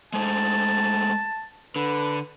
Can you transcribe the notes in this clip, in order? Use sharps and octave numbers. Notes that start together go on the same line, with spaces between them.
G#3 A3 C5 A5
D3 B4